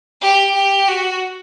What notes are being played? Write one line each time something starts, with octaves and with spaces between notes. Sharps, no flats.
G4
G4
F#4